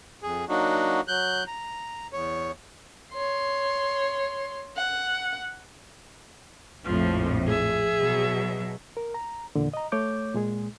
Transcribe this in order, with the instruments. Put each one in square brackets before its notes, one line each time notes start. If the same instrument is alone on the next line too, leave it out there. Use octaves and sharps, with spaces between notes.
[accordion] F2 G#4
F#3 A#3 D4 D#4 F#4
F#3 F#6 G6
A#5
E2 C#5
[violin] C#5 C6
F#5
[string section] A#1 F2 A2 [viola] F3
[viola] G#4 E5
[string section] B2 F#3
[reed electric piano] A#4
A#5
E2 A#2 D3
D#5 A#5
A3 C#5 D6 G6
A#2 G#3 G#4